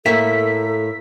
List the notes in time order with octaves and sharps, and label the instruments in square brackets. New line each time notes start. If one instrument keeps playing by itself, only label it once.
[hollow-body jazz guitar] A2 A#3 E5 [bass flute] A4 [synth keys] B6